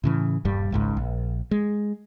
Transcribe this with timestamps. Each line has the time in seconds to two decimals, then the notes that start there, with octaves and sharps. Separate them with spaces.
0.04 A2 C#3 E3
0.45 D#1 G2 G3
0.72 G#1 C#2 G#2
0.97 A#1
1.51 G#3